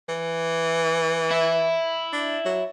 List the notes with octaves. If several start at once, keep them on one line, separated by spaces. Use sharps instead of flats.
E3
E4 E5
D4
F#3